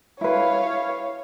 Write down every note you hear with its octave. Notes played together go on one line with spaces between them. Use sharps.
E4 B4 C#5 F5